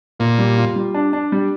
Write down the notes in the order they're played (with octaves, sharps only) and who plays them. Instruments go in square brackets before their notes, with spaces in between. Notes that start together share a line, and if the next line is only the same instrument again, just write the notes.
[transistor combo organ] A#2 [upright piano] F4
[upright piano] G3
F4
G3
D4
D4
G3